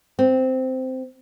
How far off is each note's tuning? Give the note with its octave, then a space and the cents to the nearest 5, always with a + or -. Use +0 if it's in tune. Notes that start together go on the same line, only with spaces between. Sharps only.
C4 -10